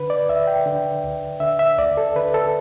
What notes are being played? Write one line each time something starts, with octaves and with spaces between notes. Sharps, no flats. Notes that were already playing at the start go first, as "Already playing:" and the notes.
Already playing: D3 B4
D5
D2 E5
G5
D3
D2
D3 E5
E5
D2 D5
A4
D3 B4
A4